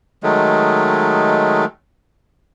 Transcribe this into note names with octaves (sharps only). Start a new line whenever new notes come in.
D#3 F#3 G#3 A3